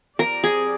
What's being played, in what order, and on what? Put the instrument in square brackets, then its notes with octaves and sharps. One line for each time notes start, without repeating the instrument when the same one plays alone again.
[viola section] F3 C4 G4 D5 [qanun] A#4
[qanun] G#4